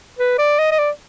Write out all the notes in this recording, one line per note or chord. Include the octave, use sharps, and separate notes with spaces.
B4
D5
D#5
D#5
D5